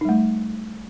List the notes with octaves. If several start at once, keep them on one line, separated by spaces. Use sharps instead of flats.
G3 A3 D#4